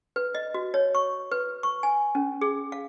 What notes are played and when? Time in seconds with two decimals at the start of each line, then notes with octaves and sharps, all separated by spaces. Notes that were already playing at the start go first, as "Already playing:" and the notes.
0.16 B4
0.35 D#5
0.54 F#4
0.74 C#5
0.95 C#6
1.31 B4
1.63 C#6
1.83 G#5
2.15 C#4
2.42 G#4
2.72 F5